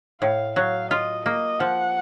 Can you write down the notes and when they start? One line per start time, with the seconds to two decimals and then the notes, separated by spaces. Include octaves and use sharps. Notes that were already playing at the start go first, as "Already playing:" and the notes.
0.22 A2 F5
0.56 F#3 F5
0.91 F4 D#5
1.26 A#3 D#5
1.60 F3 F#5